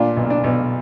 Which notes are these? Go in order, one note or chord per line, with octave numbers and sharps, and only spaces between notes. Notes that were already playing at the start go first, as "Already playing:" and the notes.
Already playing: A#2 D4 F4
B1
D4
B1